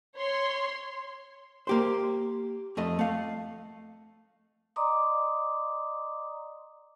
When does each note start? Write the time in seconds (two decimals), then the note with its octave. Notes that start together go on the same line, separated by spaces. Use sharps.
0.17 C#5 C6
1.67 A#3 G4 C5
2.77 F2 A3 D#5
2.99 A3 F5
4.76 D5 D#5 A#5 C6 D6 D#6